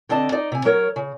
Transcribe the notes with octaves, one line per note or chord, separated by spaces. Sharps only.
D3 C4 D5 D#5 A5
D#4 D5 D#5
C3 G#5
F#3 A#4 C#5
C#3